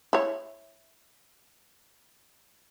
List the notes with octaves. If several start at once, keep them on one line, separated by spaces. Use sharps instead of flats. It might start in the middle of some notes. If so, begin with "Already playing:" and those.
E4 C#5